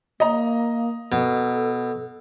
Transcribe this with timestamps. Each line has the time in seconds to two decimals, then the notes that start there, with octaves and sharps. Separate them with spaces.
0.20 A#3 D#5 A#5
1.12 B2 A4